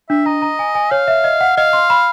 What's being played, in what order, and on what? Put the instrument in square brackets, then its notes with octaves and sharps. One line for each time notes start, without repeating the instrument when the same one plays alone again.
[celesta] D4 [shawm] E5
[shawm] D#5 [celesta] A#5
[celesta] A#5
G#5
G#5
[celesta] C#5 [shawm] F5
[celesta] E5
D#5
F#5
[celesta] D#5 [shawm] F5
[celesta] C6
B5